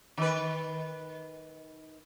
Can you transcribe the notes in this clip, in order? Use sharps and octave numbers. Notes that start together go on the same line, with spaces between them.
D#3 B4